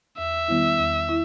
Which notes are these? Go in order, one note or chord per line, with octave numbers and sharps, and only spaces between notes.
E2 E5
D#3 G3 B3 E4
E2
E4